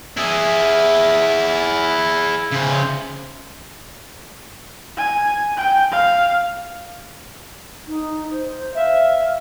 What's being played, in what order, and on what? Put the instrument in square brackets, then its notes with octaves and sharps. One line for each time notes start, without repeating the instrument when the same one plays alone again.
[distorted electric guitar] E4 G#4
C#3 C5
[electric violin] G#5
G5
F5
[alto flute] D#4
C5
[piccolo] E5 [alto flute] F5